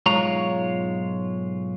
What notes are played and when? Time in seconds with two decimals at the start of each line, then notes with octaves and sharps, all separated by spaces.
0.06 B1 G#2 G#3 F4 C#5 A#5